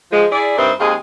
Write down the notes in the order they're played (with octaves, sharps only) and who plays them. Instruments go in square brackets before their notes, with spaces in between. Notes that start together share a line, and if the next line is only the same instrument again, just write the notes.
[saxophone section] F3 G#3
E4 G#4 D5
G2 C4 D#4 A#4 E5
D#2 G#3 C4 G#4 F5